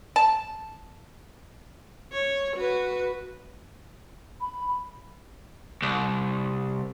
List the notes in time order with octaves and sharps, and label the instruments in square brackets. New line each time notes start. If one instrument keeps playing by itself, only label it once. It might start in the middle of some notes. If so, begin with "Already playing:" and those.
[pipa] A5
[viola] C#5
F#4 B4
[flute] B5
[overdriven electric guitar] C2